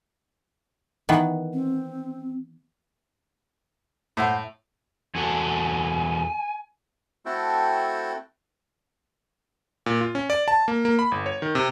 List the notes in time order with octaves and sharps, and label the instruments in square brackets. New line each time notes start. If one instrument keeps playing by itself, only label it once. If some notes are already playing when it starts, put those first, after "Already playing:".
[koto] D#3 E3 B3
[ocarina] C4
[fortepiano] A2 [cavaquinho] C5 F#5 C6
[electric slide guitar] E2 F#4 A4 [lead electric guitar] G#5
[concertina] A3 C4 E4 F#4 A4 G5
[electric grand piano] A#2
F4
C#4
D5
A5
A#3
A#3
B5
G1
C#5
D#3
C3